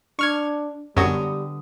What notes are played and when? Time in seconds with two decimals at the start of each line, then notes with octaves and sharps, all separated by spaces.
0.19 D4 C#6 F6 G#6
0.96 F#2 D3 F#3 G3 B3 F#4 D#6